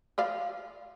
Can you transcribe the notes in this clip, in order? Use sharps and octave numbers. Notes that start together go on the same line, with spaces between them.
F3 D5 F5